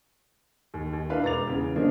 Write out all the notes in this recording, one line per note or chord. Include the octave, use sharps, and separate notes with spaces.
D#2
D#2
D4 E4 A#4 B4 F5 B5
E1 A#5 D6 A6 F7
E2 C#3
D3 D#3 F3 A#3 D4 D#4